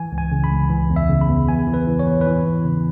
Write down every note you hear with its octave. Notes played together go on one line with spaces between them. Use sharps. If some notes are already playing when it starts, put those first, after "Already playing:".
Already playing: E3 G#5
C#2
G#5
C#3
B5
C#2
E3
E2
E5
C#3
B5
E2
E2 G#5
E3
B4
E3
C#5
E2 B4
E3 B4
E2
C#3